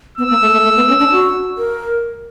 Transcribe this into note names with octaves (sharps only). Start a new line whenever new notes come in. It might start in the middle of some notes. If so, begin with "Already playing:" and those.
B3 E6
A#3
A3
A3
A3
B3
C#4
D4
F#4
A#4